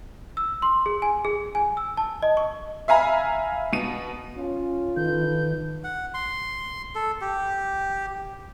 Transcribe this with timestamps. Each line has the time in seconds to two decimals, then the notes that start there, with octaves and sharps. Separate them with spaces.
0.37 E6
0.62 C6
0.86 G#4
1.02 G#5
1.25 G#4
1.55 G#5
1.77 E6
1.97 A5
2.23 D#5
2.37 C#6
2.88 E5 F5 G#5 A#5 B5
3.73 B2 D#7
4.37 C#4 F4
4.97 D#3 A4 B4 G6
5.84 F#5
6.14 C6
6.95 A4
7.21 G4